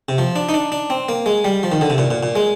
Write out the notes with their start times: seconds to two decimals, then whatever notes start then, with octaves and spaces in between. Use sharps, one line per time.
0.09 C3
0.18 F3
0.36 D4
0.49 D#4
0.54 D4
0.72 D4
0.90 C4
1.09 A#3
1.26 G#3
1.44 G3
1.63 F3
1.72 D#3
1.81 D3
1.90 C3
1.98 A#2
2.10 A#2
2.23 A#2
2.35 G#3